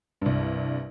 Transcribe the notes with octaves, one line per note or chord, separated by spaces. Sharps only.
C2 G2